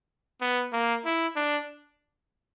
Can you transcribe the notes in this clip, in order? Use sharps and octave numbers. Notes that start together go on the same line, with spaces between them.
B3
A#3
E4
D4